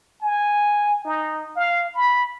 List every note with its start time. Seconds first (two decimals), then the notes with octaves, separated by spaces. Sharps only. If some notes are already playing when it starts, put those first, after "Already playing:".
0.22 G#5
1.05 D#4
1.56 F5
1.94 B5